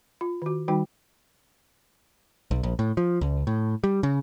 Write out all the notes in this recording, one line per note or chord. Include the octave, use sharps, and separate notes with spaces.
F4
D#3 F#4
D#3 G3 D#4 F#4 G5
B1
A#1
A2
F3
C#2
A2
G3
C#3